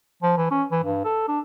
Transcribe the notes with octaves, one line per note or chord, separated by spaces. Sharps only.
F3
E3
C#4
E3
G2
A4
D4